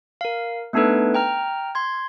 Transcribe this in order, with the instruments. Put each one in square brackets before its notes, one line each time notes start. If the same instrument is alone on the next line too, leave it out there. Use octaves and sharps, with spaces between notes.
[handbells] A#4 F5
A3 B3 D4 D#4 A4 B4
G5 A#5 F6
C6 G#6